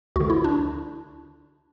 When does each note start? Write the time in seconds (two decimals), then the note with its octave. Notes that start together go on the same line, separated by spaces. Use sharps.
0.16 D2 D3 F#4
0.30 E4
0.44 D4